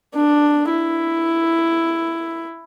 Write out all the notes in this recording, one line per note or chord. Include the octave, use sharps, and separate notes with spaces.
D4
E4